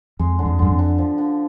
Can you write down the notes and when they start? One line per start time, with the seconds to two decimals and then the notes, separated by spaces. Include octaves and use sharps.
0.19 F2 G#3
0.39 D3
0.46 F2
0.59 F#2 D3
0.71 F2
0.79 D3
0.98 F3
1.18 D3